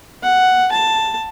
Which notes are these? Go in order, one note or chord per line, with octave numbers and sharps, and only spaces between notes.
F#5
A5